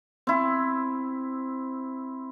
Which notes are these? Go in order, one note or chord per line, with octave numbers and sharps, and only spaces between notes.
C4 E4